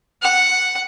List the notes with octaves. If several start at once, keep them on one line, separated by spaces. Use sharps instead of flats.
F#5